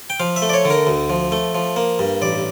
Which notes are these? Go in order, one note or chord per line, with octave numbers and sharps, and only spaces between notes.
G5
F3 F5
E5
A3
D5
C#5
D3
A#4
D2
F3
A3
F3
A#3
G2
A1 D5